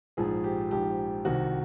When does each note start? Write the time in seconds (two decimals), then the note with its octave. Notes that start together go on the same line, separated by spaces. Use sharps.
0.17 A#1 G#2 F3 G#4
0.44 G4
0.71 A#1 G#2 F3 G4
1.25 C2 C3 D#3 F#4